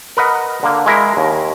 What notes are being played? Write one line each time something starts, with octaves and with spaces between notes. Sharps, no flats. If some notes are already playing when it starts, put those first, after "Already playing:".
A#4 B4 D#5 F#5
D3 A#3
G#3 E4 A#4
D#2